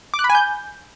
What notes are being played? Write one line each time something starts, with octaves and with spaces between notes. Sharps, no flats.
D6
F#6
B5
G#5
G6